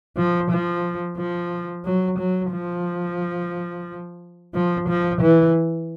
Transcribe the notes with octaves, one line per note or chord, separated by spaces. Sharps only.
F3
F3
F3
F#3
F#3
F3
F3
F3
E3